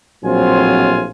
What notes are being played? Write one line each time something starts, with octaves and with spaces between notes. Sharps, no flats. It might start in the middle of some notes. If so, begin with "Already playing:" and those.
A#1 A2 F#3 C4 F4 G#5